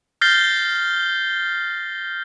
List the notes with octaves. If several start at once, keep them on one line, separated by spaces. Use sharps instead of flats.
F6 G6 A6 A#6 C7 G7